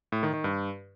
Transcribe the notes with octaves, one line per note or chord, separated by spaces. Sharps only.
A2
D#3
D#3
G2